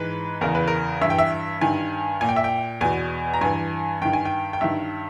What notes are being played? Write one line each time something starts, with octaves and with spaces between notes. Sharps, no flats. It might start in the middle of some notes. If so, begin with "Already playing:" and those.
Already playing: G#2 E3 B4
E2 C#3 E3 A#4
B4
A#4
G2 E3 E5
G5
E5
G2 D#3 G#5
A#2 G#5
G5
E5
G5
E2 B2 G#5
A#5
G2 E3 G#5
G2 D#3 G5
G#5
G5
G5
G2 D#3 E5